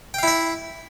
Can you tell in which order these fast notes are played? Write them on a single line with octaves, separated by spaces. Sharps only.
G5 F5 E4 E5